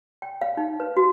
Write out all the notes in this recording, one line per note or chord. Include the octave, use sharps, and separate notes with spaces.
G5
F5
D#4
B4
F#4